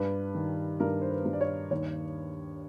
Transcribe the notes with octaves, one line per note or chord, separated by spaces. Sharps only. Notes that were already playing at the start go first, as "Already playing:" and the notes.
Already playing: G2 B4
D#3
G2 A#4
C5
B4
G2
D5
C#5
D#2 C#5